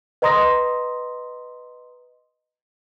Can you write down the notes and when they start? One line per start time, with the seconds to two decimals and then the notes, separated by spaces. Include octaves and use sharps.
0.22 B4 D#5 A#5 C6 D#6 A#6